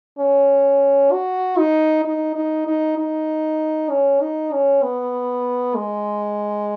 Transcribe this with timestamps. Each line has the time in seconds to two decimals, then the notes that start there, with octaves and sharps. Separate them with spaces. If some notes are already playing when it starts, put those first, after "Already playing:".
0.19 C#4
1.12 F#4
1.58 D#4
2.05 D#4
2.35 D#4
2.67 D#4
2.98 D#4
3.90 C#4
4.21 D#4
4.53 C#4
4.83 B3
5.76 G#3